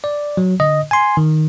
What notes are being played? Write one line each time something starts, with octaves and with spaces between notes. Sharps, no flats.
D5
F#3
D3 D#5
G#5 C6
D#3